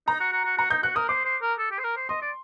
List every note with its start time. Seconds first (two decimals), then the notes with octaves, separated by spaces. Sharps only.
0.07 D#4 A#5
0.20 F#4
0.32 F#4
0.45 F#4
0.58 F#4 A#5
0.71 D#4 G6
0.83 F#4 F#6
0.95 A#4 D#6
1.09 C5 D6
1.25 C5
1.42 A#4
1.59 A4
1.71 G4
1.79 C5
1.84 A#4
1.97 C5
2.09 D#5 C6
2.22 D5